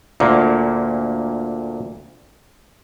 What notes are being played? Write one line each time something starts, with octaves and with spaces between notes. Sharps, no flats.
D2 A#2 A#3